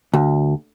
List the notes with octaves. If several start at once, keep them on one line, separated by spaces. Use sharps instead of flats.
D2